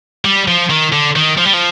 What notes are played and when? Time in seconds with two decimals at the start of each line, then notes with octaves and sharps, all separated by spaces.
0.25 G3
0.48 F3
0.70 D#3
0.92 D3
1.16 D#3
1.38 F3
1.45 G3
1.53 F3